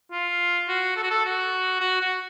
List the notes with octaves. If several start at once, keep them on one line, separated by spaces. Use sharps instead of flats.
F4
F#4
A4
F#4
A4
F#4
F#4
F#4